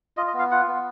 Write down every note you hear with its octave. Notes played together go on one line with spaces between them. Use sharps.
F4 D#5
D#5
B3 F5
F4 F#5
B3